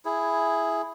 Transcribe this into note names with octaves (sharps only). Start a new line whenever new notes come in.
E4 G#4